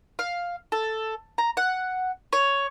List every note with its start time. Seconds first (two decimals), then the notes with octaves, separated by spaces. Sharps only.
0.19 F5
0.72 A4
1.38 A#5
1.57 F#5
2.33 C#5